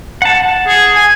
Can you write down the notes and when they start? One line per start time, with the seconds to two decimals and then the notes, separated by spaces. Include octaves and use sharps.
0.22 F#5 A5
0.68 G#4
0.95 G#5